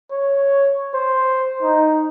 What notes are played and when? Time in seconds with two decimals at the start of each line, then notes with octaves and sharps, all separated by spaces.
0.11 C#5
0.94 C5
1.62 D#4